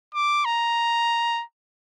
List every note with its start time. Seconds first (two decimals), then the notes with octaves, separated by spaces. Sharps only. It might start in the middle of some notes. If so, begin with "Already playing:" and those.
0.14 D6
0.45 A#5